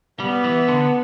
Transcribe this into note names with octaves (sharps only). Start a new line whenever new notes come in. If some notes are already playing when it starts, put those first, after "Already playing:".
G3 B3
E3
D3